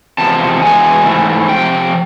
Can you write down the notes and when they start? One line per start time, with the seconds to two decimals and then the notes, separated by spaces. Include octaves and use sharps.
0.18 E2 C3 F3 G#3 B3 A5
0.62 E2 B2 G#3 B3 G#5
1.06 G#2 E3 A3
1.49 C3 F3 G5